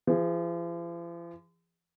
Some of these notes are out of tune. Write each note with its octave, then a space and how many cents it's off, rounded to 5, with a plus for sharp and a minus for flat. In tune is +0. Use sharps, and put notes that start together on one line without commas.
F3 -45 G#4 -30